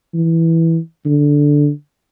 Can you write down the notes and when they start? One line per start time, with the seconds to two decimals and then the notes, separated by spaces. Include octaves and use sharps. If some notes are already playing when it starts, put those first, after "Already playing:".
0.14 E3
1.06 D3